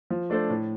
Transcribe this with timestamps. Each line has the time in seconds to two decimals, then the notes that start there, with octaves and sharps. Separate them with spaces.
0.10 F3
0.30 A3 D4 A4 C5
0.50 A2